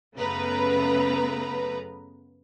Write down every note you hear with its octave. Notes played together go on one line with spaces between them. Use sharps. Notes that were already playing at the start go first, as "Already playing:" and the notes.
F#2 C#3 A3 B3 B4 A#5